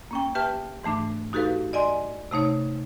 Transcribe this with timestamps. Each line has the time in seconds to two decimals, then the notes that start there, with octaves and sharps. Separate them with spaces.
0.11 A#3 C#4 G5
0.35 G4 B4 E5 G5 A5 F6
0.83 G#2 E3 A3 D4 D6
1.33 D#4 F#4 G4 A4 B4 F5
1.73 D5 D#5 G#5 C6
2.31 C3 A3 D#4 C#5